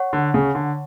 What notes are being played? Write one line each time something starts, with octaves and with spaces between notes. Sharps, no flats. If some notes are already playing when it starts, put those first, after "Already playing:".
Already playing: C#5 F#5 C#6
D3
C#3
D3